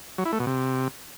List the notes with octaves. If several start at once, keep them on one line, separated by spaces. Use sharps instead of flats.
F#3
E4
A3
B2
C3